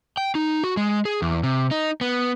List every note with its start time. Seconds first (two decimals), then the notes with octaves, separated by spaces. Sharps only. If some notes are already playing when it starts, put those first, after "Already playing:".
0.17 G5
0.35 D#4
0.64 F#4
0.77 G#3
1.05 G#4
1.22 E2
1.43 C3
1.71 D#4
2.01 B3